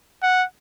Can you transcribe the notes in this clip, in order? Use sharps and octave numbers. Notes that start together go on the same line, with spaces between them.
F#5